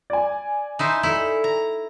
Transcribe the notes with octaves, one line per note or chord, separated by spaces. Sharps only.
D5 G#5
D#4 E4 C5
D#4 E4 A4
A#5